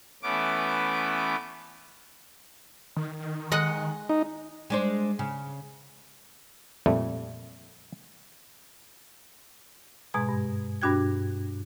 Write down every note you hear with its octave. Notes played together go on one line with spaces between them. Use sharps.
E3 A3 B3 C#4 D6
D#3
G#3 D#5 F#5
D#4
G#3 D4 C5
C#3
F2 A#2 G3 A3
G#2 B2 G#3 A#5 G#6
G2
G2 B2 D4 F#4 G5 G#6